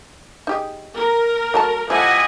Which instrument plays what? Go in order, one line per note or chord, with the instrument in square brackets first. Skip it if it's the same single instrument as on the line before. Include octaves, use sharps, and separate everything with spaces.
[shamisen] D#4 G4 G#4
[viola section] A#4
[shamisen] F#3 A3 A5
[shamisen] F3 A3 [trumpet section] E4 G4 D#5 [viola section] F#5 G#5